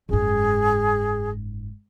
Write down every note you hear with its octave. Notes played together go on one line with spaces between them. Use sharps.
F#1 G#2 G#4